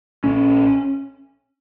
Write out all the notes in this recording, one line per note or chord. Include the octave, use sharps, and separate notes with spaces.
A#1 C#4